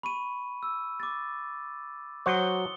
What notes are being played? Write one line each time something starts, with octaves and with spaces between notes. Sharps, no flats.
B5 C#6 D#7
E6
D6 A6
F#3 F#4 C5 D#6 C#7 G7